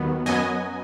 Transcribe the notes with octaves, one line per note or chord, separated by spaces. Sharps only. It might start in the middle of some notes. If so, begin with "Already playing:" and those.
Already playing: D#2 D#3 F#3 B3
F#2 F#3 B3 D#5 G#5